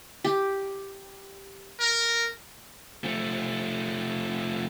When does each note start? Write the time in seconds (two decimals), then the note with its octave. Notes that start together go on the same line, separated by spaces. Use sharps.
0.24 G4
1.80 A#4
3.04 F3 A3